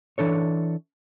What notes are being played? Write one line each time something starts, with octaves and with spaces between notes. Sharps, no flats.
E3 D4 A4 C#5